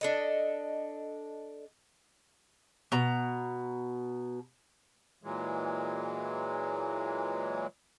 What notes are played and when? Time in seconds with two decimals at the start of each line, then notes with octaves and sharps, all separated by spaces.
0.01 D4 A4 D#5
2.92 B2 A#5
5.23 A#2 E3 F#3 G#3